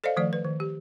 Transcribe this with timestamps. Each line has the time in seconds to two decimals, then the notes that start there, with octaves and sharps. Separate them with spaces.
0.04 A4 C5 D5 D#5 F5
0.16 D#3 F3 A3 D5
0.33 B4
0.44 D#3
0.60 G4